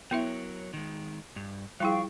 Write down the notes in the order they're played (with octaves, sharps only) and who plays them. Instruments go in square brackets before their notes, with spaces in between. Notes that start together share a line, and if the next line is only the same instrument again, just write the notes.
[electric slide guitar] F#3 A#4 C#5 [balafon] B3 E4 E5
[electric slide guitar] D#3 G#3
G2
[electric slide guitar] F3 [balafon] G3 E4 G#4 [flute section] F5 G5 C#6